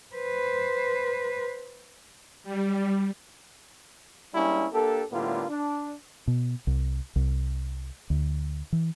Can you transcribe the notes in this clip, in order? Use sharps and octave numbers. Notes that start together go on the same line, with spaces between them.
B4 C5
G3
G3 G#3 A#3 C#4 D4 E4
A#3 D4 G4 A4
A2 D3 G3 A#3 B3 F4
D4
B2
C2
C2
D2
E3